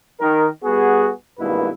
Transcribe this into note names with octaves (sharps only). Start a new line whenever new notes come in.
D#3 A#4
G3 B3 F#4 G#4
G#1 G2 B2 A#3 E4 B4